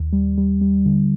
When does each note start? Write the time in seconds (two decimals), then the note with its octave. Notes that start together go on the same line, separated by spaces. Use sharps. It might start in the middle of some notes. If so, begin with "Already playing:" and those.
Already playing: D#2
0.13 G3
0.38 G3
0.61 G3
0.86 D3